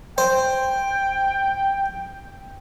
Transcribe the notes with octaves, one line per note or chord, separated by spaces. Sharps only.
C5 G5